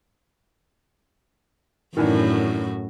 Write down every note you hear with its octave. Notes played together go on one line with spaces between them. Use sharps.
F#2 A2 D#3 E3 D4 F#4